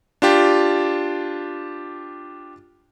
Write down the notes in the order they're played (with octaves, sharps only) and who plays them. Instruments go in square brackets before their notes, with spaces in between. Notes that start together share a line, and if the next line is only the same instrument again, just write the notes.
[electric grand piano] D4 F4 G4